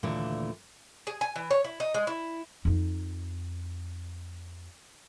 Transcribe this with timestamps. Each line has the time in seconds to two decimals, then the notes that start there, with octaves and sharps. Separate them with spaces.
0.03 D#2 A#2 D3 E3 A3
1.07 G#4
1.21 G#5
1.36 E3
1.51 C#5
1.64 E4
1.80 D#4
1.94 G#3
2.07 E4
2.65 F2 D#4